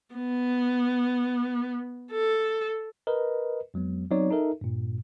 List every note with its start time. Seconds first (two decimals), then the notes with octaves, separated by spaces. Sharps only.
0.15 B3
2.11 A4
3.07 A#4 B4 D#5
3.74 F2 F#3 G#3 B3
4.11 F#3 B3 C4 D#4 C#5 D5
4.31 D#4 A4 A#4 E5
4.61 G2 A#2